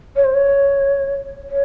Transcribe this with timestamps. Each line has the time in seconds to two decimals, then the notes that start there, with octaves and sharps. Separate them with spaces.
0.16 C#5
0.25 C5
0.34 C#5
1.50 C#5